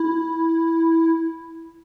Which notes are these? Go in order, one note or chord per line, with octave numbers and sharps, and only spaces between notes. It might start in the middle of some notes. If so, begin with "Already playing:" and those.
Already playing: E4